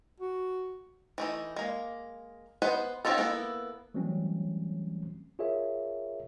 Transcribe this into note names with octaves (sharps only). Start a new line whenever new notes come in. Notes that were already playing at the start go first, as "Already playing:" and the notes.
F#4
E3 A3 D#4
G#3 A#3
B3 B4 C5 D#5 F#5
C4 C#4 D#4 F4 A4
A#3 B3 E4 A4
E3 F#3 G3 A3 C4 C#4
F4 G#4 A#4 C#5 E5